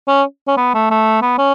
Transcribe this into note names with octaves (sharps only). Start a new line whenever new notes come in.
C#4
C#4
B3
A3
A3
B3
C#4